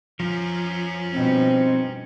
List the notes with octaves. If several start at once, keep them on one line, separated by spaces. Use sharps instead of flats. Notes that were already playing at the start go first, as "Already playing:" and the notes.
F3 C#4 A#4
G2 B2 C4 D#4